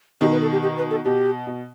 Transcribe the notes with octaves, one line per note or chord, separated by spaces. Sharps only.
B2 D#3 G4
B4
A4
G4
G4
B4
A4
B2 G4
B2